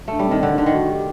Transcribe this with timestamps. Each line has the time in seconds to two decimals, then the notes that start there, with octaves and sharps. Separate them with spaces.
0.08 A3 D4
0.19 G3
0.27 D#3 C4
0.43 D3 D4
0.58 D3 D#4
0.66 D#3
0.74 F#4
0.90 G4